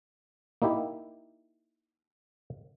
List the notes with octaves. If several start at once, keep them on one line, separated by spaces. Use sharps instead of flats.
A#3 D#4 E4 G4